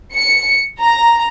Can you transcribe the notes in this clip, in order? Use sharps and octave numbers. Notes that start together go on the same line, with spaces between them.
C#7
A#5